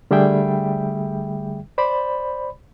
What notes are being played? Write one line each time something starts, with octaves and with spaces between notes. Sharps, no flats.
D3 G3 A3 G#4 E5 G5
C5 D5 B5